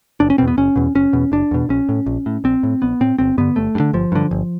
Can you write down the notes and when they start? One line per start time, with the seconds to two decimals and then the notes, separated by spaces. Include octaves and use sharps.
0.20 F#1 D4
0.30 C#4
0.38 E2 B2 C4
0.48 B3
0.57 F#1 C#4
0.76 E2 B2
0.95 F#1 C#4
1.13 E2 B2
1.32 F#1 D4
1.51 E2 B2
1.69 A#1 C#4
1.89 A2
2.06 A#1
2.26 A2
2.44 A#1 C4
2.63 A2
2.82 A#1 B3
3.01 A2 C4
3.19 G1 C4
3.38 G2 D3 B3
3.56 G1 A3
3.75 G2
3.80 D3
3.93 G1 F3
4.12 G2 D3
4.31 G1